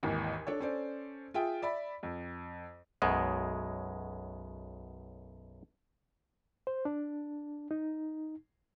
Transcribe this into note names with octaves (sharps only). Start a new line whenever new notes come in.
G#1 D#2 E3
D4 A4 C#5
C#4 A4 C5 D5
F4 G#4 E5 G5
D5 E5 B5
F2
B1 F#2 B2 G#3
C5
D4
D#4